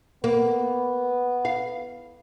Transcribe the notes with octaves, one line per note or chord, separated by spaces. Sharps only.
A#3 B3
F5